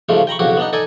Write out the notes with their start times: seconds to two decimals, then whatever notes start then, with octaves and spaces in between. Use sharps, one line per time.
0.09 G#2 C#3 F3 G3 A3
0.27 G5 A#5 B5 C#6
0.39 B1 F2 C#3 F#4 G4
0.57 B3 D4 D#4
0.73 D#4 A4 D5 G#5